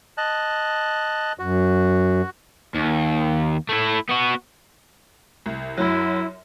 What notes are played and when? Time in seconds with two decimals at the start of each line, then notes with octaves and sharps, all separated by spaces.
0.18 D#5 A5 F#6
1.39 F#2 F#4
2.75 D#2
3.69 A3 E4
4.09 B3 F#4
5.46 C2
5.77 F#2 F#3 E4